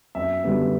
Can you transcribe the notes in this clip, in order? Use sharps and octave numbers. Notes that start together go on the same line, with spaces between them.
F#2 E5
D3 G3 B3